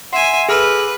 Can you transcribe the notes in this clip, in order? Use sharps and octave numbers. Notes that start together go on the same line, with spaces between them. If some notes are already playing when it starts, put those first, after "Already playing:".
E5 F#5 G#5 C6 C7
G#4 A4 B4 E6 F6